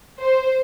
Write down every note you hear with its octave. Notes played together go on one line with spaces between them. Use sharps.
C5